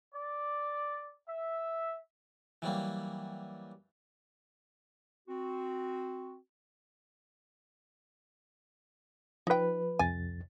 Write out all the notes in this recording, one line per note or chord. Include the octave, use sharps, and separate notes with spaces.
D5
E5
E3 F#3 G3 A#3
C4 F#4
F3 D#4 B4 G5
C2 F2 G#5 A6